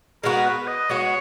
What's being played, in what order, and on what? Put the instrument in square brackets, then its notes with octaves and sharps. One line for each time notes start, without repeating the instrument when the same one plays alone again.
[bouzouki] G#3 B3 F#4 [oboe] A#4
[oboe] B4
D#5
[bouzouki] G#3 B3 F#4 [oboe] C#5